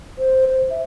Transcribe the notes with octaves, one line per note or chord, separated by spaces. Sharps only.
C5
C5
E5